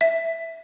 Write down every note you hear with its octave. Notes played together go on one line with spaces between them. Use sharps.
E5